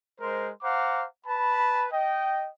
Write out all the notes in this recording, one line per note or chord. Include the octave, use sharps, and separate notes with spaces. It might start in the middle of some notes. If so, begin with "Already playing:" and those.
G#3 A#4 C5
C5 F5 F#5 A#5 D6
B4 A5 B5
D#5 G5